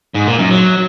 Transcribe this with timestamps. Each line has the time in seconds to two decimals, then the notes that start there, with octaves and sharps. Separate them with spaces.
0.15 G#2
0.27 A#2
0.39 F#2
0.51 F#3